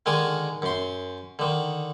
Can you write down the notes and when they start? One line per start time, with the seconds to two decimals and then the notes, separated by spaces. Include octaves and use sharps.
0.06 D3 D#3 G#3 A#4 G#5
0.62 F#2 C6
1.39 D3 D#3